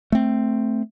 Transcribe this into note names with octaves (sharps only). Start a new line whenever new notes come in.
A3 C4